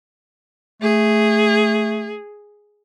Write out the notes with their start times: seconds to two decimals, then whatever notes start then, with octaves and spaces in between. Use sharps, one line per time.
0.82 A3 G#4